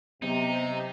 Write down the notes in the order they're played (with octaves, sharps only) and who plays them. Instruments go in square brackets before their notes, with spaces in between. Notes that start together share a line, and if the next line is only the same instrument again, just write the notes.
[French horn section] C3 [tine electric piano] F#3 B3 [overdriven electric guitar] D#4